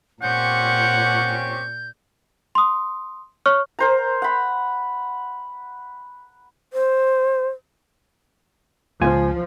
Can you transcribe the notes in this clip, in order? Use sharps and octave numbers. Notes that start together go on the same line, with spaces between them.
A#2 C4 C#4 G4 F#5 C#6 G6
C6 D#6
C#5 C#6 F6
A#4 C5 A#5
F#5 B5
C5
C#2 F3 F4 G#5